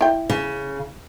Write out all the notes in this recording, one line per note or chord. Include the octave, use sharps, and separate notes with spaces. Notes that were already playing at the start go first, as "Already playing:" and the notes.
E4 G5
C#3